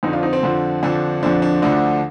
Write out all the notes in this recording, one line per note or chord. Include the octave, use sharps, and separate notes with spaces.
F2 D3 F3 C4 D#4
D4 F4
C4 D#4
C4
F2 D3 F3
F2 D3 F3 D4
F2 D3 F3 D4
D4
D2 D3 F3 D4